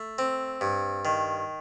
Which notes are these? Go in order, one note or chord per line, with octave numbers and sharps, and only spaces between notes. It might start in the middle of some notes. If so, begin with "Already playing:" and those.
Already playing: A3
C4
G2
D#3